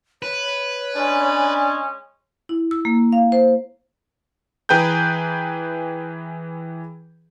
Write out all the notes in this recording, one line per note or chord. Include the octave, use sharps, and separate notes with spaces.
B4 C#5
G#3 C#4 D4
E4
E6
A#3
F5
C5
E3 G#4 B4 G5 A#5 G6